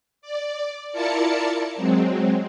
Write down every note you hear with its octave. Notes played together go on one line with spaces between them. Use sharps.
D5
E4 F4 A#4 D5 A5 C#7
F#3 G#3 C4